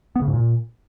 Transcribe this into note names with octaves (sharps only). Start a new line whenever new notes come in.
B3
C#3
G#2
A#2